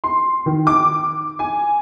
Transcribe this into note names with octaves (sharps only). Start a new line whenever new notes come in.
C6
D#3
D6
G#5